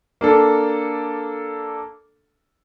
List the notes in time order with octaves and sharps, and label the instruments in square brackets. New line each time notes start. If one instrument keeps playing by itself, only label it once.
[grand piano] A#3 D4 A4